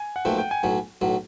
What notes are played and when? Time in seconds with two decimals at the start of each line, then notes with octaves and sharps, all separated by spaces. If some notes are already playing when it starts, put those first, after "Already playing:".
Already playing: G#5
0.16 F#5
0.25 B1 A#2 F3 A3 G5
0.38 G5
0.51 G#5
0.63 B1 A2 F#3
1.01 B1 A2 F#3